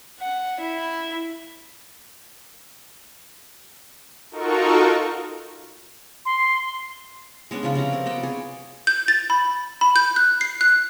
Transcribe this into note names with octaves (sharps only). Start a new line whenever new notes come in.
F#5
E4
D#4 F4 F#4 A4 A#4 C#6
C6
G#3 B3 C#4 D4
C#3 F3 D4 F4
C3 C#4 A4 A#5
C4 A#4
B3 D#5 G5 A5
G#4 C#5 D5
G6
A6
B5
B5
G6
F#6
C7
F#6